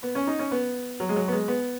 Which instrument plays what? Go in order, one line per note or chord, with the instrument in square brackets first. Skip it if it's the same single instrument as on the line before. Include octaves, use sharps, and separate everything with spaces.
[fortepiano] B3
C#4
D#4
C#4
B3
F#3
G#3
F#3
B3
G#3
B3